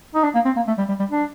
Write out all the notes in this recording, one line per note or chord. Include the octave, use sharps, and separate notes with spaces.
D#4
D4
A#3
C4
A#3
A3
G3
G3
G3
D4